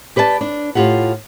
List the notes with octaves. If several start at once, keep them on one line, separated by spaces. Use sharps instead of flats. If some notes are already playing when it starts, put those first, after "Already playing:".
G4 B4 D5 F#5 A5
D4
A2 F4 G4 F#5